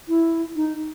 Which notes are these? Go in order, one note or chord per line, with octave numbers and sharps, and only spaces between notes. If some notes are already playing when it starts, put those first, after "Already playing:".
E4
D#4